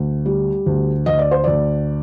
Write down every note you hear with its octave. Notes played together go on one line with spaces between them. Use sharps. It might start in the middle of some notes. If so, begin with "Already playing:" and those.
Already playing: D2
G3
D2
D2 D#5
D5
C5
D2 D5